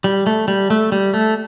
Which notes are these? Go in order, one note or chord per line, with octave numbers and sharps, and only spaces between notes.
G3
A3
G3
A3
G3
A3